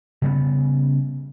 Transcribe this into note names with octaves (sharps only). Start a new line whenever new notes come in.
C#3 G3 B3